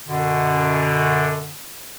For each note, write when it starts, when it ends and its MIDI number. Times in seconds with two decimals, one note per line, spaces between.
0.08 1.54 42
0.08 1.54 47
0.08 1.54 50